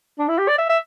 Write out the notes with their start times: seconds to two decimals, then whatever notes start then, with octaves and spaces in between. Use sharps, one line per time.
0.19 D4
0.28 E4
0.38 G4
0.48 D5
0.58 E5
0.69 E5